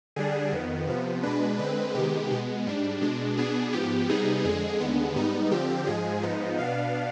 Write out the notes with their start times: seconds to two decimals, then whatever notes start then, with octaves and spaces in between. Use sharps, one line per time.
0.16 D3 G3 D4 G#4
0.52 F2 D#3 B3
0.87 C3 F3 B3
1.23 B2 G#3 D4 B4
1.59 D3 G#3 C4 B4
1.95 C3 D#3 G#3 B3 G4
2.31 B2 G#3 B3
2.67 G#2 G3 D4
3.01 B2 G#3 D4
3.37 B2 B3 D4 G#4
3.73 G#2 F3 B3 G4
4.09 C3 G3 B3 D#4 G#4
4.44 F2 D3 G#3 G#4
4.80 D#2 D3 G#3 B3
5.16 G#2 G3 B3 D#4
5.51 D3 F3 C4 G4
5.87 G#2 F3 G#3 G#4
6.23 G#2 F3 B3 D#4
6.59 B2 B3 D4 F5